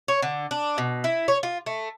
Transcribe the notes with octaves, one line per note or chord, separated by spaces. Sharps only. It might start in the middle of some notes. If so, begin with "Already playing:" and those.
C#5
D3
D4
B2
E4
C#5
F4
A3